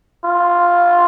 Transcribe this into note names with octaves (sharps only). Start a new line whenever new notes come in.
F4